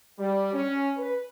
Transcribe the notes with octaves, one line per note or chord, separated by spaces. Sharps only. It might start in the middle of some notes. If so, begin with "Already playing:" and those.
G3
C#4
B4